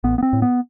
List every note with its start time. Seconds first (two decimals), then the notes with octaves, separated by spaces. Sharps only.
0.04 A1 B3
0.18 B3
0.23 C4
0.33 A2
0.42 B3